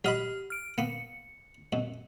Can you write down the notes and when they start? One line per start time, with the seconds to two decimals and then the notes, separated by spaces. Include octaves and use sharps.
0.04 F#3 G4 D#5 B5 F6
0.50 F6 D7
0.78 A#3 B3 C#7
1.73 F#2 B2